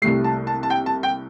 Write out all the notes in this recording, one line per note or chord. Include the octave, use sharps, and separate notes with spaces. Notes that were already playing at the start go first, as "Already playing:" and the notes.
C2 C3 A3 C7
A5
A5
A5
G5
A5
G5